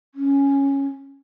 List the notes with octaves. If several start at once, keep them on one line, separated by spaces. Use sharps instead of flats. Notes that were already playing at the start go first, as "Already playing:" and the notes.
C#4